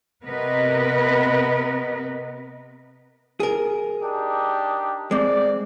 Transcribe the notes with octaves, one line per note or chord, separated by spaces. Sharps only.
C3 B3 A#4 B4 D#5
G#4 A#4
D4 D#4 G4
G#3 C4 D5